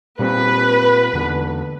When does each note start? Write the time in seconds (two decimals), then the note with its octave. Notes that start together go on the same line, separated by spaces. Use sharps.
0.19 A#2 G3 C4 B4
1.13 E2 D3